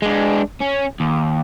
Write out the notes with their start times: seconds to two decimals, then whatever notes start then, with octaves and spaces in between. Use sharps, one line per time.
0.02 G#3 D4
0.60 C#4
1.00 D#2